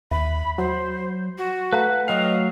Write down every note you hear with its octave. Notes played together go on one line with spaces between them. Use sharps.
D#2 E5 B5
F#3 C5
F#4
A3 B4 F5 F#5 A#5
F#3 D#5 F5 G5